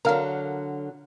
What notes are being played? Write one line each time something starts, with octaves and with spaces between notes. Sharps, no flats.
D3 F#3 A#4 F5